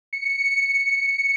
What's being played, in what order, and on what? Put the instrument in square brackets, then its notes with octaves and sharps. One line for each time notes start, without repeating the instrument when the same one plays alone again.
[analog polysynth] C#7